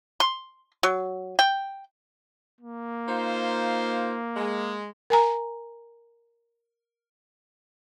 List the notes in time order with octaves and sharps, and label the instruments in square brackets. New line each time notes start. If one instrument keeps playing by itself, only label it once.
[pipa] C6
F#3
G5
[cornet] A#3
[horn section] D#4 F4 C5
G#3
[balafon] A#4 G#5 A#5